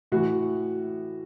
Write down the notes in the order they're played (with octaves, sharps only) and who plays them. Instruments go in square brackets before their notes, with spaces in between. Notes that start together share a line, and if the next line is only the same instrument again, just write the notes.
[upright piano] A2 E3 F#4